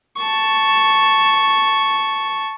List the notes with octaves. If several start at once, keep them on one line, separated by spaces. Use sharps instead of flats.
A5 C#6